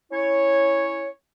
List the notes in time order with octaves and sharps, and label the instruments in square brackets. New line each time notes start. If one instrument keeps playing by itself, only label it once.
[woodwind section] C#4 E4 C#5